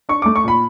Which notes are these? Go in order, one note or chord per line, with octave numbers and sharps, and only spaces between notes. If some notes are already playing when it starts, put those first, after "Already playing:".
D4 C#6
A3 D6
C#6
A#2 B5